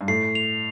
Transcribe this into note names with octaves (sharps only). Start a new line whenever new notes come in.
G2
A2 C7
F7